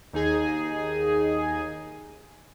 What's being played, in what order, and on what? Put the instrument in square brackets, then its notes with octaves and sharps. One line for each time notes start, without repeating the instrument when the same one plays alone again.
[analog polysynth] D#2 D#4 G#4 G#5